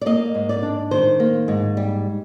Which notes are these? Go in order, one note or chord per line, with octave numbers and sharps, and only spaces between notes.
D5
A#3 D#5
G#2
D5
D4
D#3 C5
A#3
G#2
G3